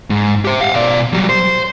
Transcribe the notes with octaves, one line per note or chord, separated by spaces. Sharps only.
G#2
G4 C5
F5 F#5
B2 D5
F#3 G3
C5